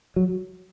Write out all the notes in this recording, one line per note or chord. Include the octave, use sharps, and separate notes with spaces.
F#3